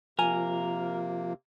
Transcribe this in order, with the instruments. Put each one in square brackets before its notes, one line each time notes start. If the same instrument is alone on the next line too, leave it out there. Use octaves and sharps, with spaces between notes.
[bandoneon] C3 A#3 [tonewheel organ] F3 [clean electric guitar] A#4 [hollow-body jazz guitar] G#5